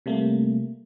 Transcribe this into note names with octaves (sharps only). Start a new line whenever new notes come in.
C3 G3 A3 A#3